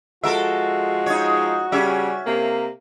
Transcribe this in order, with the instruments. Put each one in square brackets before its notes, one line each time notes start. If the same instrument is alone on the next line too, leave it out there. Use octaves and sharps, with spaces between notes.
[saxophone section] F3 G#3 [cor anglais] F#4 [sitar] A4 A#4 E5
[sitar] D#4 C#5
[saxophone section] C#3 G3 [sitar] C#4 E5
[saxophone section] C3 A#3